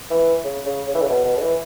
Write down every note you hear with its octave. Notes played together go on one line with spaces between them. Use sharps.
E3
C#3
C#3
C#3
E3
C#3
B2
B2
C#3
E3